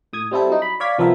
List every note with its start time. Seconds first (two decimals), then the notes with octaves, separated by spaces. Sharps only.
0.13 A2 D#6 G#6
0.31 G3 C4 E4 A4
0.50 F#3 D#4
0.62 B5
0.80 C#5 D5 F5 G#6 B6
0.98 C2 F3 A#3 B3 A#4 E5